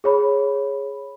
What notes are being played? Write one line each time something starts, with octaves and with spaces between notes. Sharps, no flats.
G#4 C#5 B5